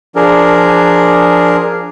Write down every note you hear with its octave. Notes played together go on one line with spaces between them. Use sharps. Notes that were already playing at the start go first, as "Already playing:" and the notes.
F3 D4 G#4 A#4